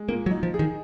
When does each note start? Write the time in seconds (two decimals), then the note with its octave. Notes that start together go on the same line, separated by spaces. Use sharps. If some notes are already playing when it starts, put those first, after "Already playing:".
Already playing: G#3
0.09 A#2 A#3
0.26 F#3
0.31 D#4
0.43 F3
0.54 G#4
0.59 D#3